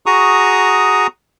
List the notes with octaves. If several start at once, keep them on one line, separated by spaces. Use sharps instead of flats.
F#4 G#4 A#5 C#6 D#6